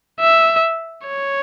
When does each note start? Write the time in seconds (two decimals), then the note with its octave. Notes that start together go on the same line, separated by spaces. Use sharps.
0.20 E5
1.07 C#5